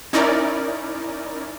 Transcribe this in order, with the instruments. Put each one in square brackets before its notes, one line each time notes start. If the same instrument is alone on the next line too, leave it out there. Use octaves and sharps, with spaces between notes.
[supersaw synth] C#4 D#4 E4 A#4 D5